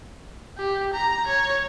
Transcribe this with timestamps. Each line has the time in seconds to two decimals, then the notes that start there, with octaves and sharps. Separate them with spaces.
0.58 G4
0.94 A#5
1.27 C#5